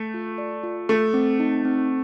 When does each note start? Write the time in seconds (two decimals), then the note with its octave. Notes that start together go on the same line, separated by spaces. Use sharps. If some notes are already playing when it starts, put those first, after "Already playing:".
Already playing: A3
0.14 F4
0.38 D5
0.63 F4
0.89 A3 A4
1.14 C4
1.40 D#4
1.65 C4